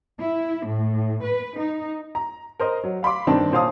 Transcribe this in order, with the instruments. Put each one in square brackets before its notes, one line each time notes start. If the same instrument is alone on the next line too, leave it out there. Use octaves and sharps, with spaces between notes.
[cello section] E4
A2
B4
D#4
[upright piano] A#5
A#4 C5 D#5
F#3
F5 B5 C6 D6
G1 D#3 C4 D4 A5
A#2 C5 C#5 F5 A5 D#6